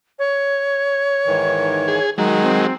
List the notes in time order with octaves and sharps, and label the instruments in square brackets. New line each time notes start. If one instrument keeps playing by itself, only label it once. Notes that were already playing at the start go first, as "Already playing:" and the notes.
[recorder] C#5
[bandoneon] G#2 D#3 E3
[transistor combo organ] G#4
[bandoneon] D#3 D#4 [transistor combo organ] F#3 G#3
[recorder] C4